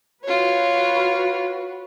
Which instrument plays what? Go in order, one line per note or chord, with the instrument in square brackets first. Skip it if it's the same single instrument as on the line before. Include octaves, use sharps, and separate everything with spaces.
[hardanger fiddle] F4 C#5 [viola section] F#4 B4